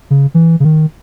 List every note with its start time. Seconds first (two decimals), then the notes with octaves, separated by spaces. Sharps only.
0.10 C#3
0.34 E3
0.60 C#3
0.64 D#3